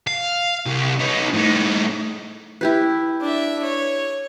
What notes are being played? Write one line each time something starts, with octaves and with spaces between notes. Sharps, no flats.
F5
C2
B3 D#4
A2 D#4
E4 G4 B4
D4 E5
C#5